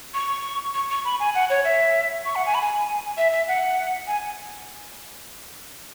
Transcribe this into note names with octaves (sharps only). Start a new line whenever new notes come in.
C#6
C#6
C#6
B5
G#5
F#5
C#5
E5
C#6
F#5
G#5
B5
G#5
E5
E5
F#5
G#5